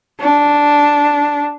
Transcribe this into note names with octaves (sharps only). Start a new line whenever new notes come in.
D4